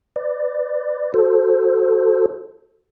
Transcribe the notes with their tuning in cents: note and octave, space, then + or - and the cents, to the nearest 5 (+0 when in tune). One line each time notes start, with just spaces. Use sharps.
B4 +30 D5 +15
F#4 +0 A4 +0 C5 +0